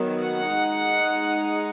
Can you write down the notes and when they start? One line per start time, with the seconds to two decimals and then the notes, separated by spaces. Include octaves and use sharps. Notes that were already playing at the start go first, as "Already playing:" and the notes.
Already playing: D#3 F#3 B3
0.22 F#5
0.51 G#3 D#4